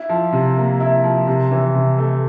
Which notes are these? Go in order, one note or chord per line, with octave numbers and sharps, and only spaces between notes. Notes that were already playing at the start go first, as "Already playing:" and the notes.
Already playing: E4
F3
C3
A#3
E4
F3
C3
E3
C3
A3